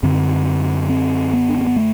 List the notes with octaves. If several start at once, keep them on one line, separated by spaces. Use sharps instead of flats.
F#2 D3 C4
C4
B3
D4
C4
B3
A3